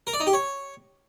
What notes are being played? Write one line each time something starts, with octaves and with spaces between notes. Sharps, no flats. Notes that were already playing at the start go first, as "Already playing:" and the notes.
A#4
D5
D#4
G4
C#5